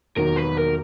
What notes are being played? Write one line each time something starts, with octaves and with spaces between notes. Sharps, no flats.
E1 D#2 D#3 F#3 A#4
B4
A#4